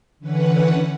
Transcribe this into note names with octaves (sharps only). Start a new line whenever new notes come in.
D3 E3 C#4 B4 F#5